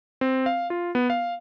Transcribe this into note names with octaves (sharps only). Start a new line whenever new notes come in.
C4
F5
F4
B3
F5